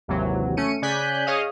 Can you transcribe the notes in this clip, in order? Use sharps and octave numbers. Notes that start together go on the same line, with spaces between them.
G#1 D#2 C3 E3 F#3
A3 C#4 C#7 D#7
C#3 D5 G#5 F#6 G6 B6
G#4 C#5 D#5 F5 D#6